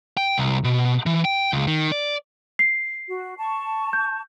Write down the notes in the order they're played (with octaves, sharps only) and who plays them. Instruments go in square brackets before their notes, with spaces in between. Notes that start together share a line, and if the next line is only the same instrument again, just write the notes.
[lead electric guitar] G5
C2
B2
E3
G5
C#2
D#3
D5
[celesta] C7
[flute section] F#4
A5 C#6
[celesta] G6